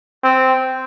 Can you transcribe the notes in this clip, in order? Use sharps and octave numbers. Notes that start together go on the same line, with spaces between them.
C4